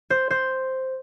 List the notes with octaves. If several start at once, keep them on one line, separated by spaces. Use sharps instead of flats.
C5
C5